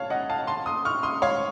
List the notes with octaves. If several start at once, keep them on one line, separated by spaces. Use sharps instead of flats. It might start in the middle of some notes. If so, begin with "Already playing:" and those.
Already playing: C#5 F5 A5
D#5 F#5
F5 A5
A5 C6
C6 D#6
C#6 F6
C6 D#6
C#5 F5